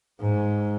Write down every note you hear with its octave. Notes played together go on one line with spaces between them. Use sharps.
G#2